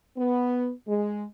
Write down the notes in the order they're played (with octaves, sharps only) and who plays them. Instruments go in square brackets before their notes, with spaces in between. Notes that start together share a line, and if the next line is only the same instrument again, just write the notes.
[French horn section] B3
G#3